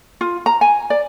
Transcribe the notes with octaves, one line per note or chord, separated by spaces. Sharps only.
F4
A#5
G#5
D5